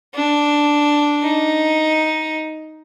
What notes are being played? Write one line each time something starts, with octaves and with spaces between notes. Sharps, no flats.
D4
D#4